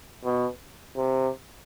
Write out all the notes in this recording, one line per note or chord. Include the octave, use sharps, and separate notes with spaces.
B2
C3